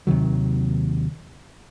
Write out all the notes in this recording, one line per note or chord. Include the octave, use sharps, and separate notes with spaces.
D#2 C3 D#3 F#3